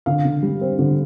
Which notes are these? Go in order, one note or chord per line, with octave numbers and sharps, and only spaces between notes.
D3 F5
D3
G3
C4
D3